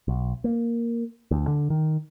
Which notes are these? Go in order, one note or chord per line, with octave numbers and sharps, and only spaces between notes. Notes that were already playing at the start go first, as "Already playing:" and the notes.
B1
A#3
D2
D3
D#3